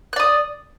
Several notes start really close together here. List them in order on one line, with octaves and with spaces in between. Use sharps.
F#6 D5 D#6